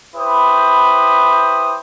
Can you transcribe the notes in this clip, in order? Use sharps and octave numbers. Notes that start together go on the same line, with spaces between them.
E4 G4 B4 C5 B5 D#6